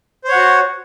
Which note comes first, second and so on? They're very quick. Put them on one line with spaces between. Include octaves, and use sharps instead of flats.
C5 C#5 F#5 F#4